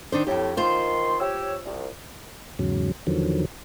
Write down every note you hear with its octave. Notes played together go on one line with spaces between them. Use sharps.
D#3 D4 C5
F2 A2 G4
D#3 F4 C5 C6
G4 C#5 E6
C2
E2 G#2 C#3 F#3
E2 D3 D#3 F3 F#3